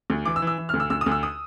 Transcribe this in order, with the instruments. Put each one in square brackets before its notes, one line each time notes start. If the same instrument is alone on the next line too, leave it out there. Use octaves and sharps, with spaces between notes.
[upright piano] D2
E3 D6
E6
E3
E6
E3
F6
D2
E6
D2 E6
D#6
D2
E6
D#6